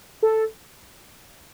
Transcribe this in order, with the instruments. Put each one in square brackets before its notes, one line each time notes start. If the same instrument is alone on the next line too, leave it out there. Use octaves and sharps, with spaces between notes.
[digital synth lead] A4